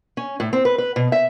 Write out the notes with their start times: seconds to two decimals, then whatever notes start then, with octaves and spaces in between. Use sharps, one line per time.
0.17 C#4
0.40 A2
0.53 C4
0.65 B4
0.78 B4
0.96 B2
1.12 E5